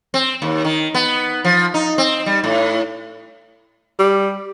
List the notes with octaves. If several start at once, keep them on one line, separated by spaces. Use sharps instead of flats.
C4
D#2
D#3
B3
F3
D#4
C4
G3
A2
G3